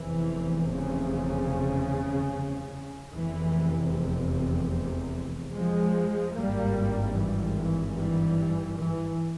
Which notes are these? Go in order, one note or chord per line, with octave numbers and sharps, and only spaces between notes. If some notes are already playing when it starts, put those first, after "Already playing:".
Already playing: F1 E2 C3 E3
C#3
F1 E2 C3 E3
F3 G#3
G#1 G2 G3 A#3
E3 G3
E3
E3 G3
E3